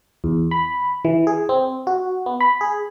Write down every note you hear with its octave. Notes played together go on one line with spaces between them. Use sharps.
E2
B5
E3
G#4
C4
F#4
B3
B5
G#4